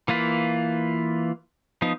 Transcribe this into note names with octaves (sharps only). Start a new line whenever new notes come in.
E3 A#3 F4 B4
F3 B3 D#4